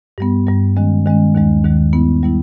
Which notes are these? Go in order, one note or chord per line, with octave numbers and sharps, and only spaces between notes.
G2 G3 B3
G2 G3 B3
D#3 G#3 C#4
D#3 G#3 C#4
D#2 D#3 G#3
D#2 D#3 G#3
G3 B3 E4
G3 B3 E4